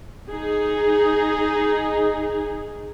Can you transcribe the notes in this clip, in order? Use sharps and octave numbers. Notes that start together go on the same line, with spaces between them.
D#4 G#4